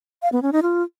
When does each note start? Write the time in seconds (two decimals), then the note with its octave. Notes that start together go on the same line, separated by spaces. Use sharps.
0.22 F5
0.32 B3
0.42 C#4
0.52 D#4
0.62 F4